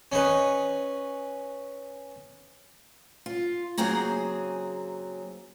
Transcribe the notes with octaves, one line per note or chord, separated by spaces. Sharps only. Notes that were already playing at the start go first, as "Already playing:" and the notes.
C#4 D#4 B4
F4
C#3 F#3 A#3 C4 G#4 A#5